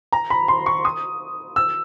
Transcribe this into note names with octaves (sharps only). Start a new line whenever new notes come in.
A#5
B5
C6
C#6
D#6
E6